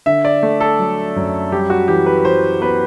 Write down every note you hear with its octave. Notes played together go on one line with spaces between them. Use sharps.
D3 E5
D5
A3
A4
F#3
F#2
G3 G4
F#4
E3 G4
B4
E3 C5
B3 B4